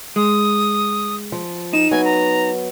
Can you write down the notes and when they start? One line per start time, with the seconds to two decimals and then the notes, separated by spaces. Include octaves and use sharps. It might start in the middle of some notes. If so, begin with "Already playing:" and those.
0.16 G#3 D#6
1.32 F3
1.73 D#4 E7
1.91 F#3 B3 G#5
2.05 A#5